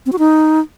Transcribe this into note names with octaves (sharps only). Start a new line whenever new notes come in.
C4
F#4
D#4